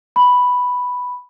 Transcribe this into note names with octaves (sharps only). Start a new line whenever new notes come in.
B5